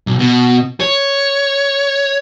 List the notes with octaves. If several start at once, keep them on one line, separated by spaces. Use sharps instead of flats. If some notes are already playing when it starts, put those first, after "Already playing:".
B1
B2
C#5